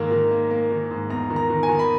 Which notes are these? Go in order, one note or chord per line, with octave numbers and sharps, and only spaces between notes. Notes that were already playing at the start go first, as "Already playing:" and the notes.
Already playing: G#2 D#3 A#3
D#3
A#3
A#3
D#3
G#2
E2 A#5
D#3
A#5
D#3
G#5
D#3
B5